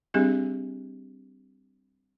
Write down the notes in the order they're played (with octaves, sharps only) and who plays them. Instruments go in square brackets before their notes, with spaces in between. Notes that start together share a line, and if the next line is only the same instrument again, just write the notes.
[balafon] G3 C4 D4 G4 G#4 D#5